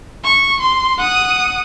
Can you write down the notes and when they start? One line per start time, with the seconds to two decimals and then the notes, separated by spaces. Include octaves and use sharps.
0.24 C#6
0.60 C6
0.98 F#5 D#6